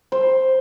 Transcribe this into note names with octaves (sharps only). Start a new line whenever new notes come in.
C5